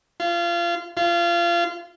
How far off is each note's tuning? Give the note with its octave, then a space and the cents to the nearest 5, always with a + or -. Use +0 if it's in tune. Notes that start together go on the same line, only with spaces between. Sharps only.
F4 -25
F4 -25